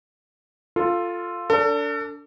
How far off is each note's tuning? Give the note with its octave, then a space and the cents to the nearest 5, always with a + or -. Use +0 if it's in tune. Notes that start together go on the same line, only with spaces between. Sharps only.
F4 +0 A4 +10
D4 -25 A4 +35